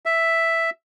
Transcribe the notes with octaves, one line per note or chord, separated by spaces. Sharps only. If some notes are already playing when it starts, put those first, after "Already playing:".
E5